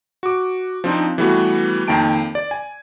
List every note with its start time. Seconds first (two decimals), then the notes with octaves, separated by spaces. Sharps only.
0.23 F#4 D6
0.84 F3 C4 D4 D#4
1.18 E3 G3 A3 B3 F#4
1.88 F2 D#3 A#3 G5 A5 D7
2.35 D5
2.51 G#5